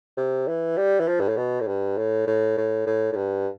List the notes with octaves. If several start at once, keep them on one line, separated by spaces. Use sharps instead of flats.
C3
E3
G3
E3
F3
G2
A2
B2
A2
G2
A2
A2
A2
A2
A2
G2